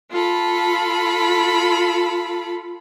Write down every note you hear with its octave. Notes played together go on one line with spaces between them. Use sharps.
F4 A4 B5